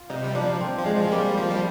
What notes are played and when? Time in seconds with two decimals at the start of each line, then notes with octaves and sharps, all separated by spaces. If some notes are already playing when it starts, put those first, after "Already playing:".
Already playing: F4
0.10 C3 D#4
0.24 G3
0.35 F3 D4
0.61 C4
0.79 F3
0.86 G#3
0.95 F3
1.04 C4
1.12 G3 A#3
1.38 F3
1.51 G3